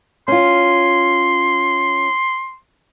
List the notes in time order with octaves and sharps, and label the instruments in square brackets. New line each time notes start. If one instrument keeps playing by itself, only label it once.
[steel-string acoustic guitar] C#4 F4 [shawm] C6